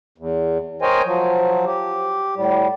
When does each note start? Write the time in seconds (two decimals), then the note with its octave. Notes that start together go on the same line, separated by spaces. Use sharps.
0.18 E2
0.82 A#4 C5 C#5 D#5 G5 G#5
1.05 F3 F#3
1.65 G4
2.36 A2 G3